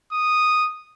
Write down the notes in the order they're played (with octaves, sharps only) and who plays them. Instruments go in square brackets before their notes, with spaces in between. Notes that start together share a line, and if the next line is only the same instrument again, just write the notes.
[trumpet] D#6